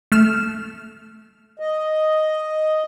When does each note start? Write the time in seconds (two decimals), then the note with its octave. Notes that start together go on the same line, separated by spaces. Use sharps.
0.12 A3 F6 E7
1.59 D#5